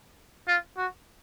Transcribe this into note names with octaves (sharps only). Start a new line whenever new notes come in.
F4
F#4